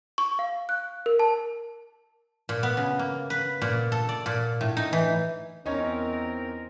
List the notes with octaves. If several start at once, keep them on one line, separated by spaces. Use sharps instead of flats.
C#6
F5
F#6
A#4
A5
A#2
B3
C#3
A#3
B4
A#2
A4
D5
A#2
A2
D#4
E3
E2 C4 C#4 D#4 A#4 C#5 D#5